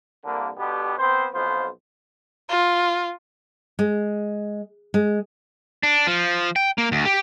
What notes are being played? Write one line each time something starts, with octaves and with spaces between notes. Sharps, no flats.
C2 D3 A#3
B2 D3 B3 G4
B3 C4 C5
B1 F2 B3 F4 C5
F4
G#3
G#3
D4
F3
G5
A#3
D2
G4